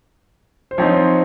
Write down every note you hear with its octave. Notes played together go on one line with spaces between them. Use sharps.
C5
F3 C4 D#4 C#5